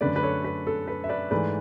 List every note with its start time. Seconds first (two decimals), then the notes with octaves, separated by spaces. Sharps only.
0.01 F#2 D3 A3 B4 D5
0.16 B4
0.23 A4 C#5
0.44 B4
0.67 A4
0.88 B4
1.04 E5
1.09 B4 D5
1.31 G#2 E3 A3 B4 D5